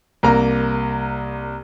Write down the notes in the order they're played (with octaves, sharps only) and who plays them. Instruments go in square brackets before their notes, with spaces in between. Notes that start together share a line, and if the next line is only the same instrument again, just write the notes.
[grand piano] C2 A#3 A#5